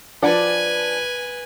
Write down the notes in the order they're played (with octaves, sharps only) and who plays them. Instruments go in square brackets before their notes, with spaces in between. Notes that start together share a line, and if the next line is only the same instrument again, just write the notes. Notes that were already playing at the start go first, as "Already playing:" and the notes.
[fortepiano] F3 D5 [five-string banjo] D4 F#5 [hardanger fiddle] B4 G#5